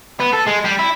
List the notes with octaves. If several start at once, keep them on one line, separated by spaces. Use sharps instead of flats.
B3
A4
G#3
G3
E4